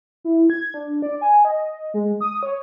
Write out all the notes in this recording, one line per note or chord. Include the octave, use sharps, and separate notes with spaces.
E4
G#6
D4
D5
G#5
D#5
G#3
D#6
C#5